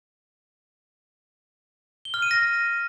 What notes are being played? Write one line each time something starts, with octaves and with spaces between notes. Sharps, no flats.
G7
F6
D#7
A#6